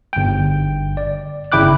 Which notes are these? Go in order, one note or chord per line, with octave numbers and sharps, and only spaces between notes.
G1 G5
D5
G1 C#3 E4 G5 D6 F#6